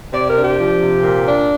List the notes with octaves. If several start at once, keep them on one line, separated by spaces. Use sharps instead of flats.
C3 D5
A#4
D4
G4
F3
C3
A#2
D4